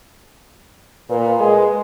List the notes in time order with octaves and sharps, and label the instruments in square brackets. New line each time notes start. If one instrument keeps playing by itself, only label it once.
[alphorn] A#2 [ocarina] B4
[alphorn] G#3